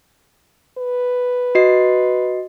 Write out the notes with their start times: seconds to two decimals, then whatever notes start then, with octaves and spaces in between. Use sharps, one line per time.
0.78 B4
1.55 F#4 D#5 C7